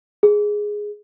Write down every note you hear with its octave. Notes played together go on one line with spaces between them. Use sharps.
G#4